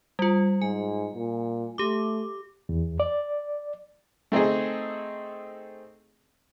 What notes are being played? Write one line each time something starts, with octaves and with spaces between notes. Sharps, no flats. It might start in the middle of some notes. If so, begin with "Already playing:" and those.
G3 F4
G#2 G#5
A#2
A3 G4 D6
E2
D5
A3 C4 D#4 G#4